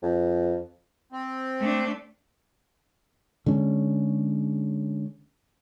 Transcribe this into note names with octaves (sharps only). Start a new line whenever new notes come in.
F2
C4
A3 D4
D3 G#3 C#4